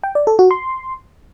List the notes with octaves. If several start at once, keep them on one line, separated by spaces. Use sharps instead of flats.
G5
D5
A4
F#4
C6